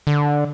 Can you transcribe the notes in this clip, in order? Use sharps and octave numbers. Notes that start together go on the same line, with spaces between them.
D3